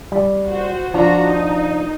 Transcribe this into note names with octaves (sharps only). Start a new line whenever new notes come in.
G3
F#4 C5
F3 D4 F4 F#4 A#5
D#4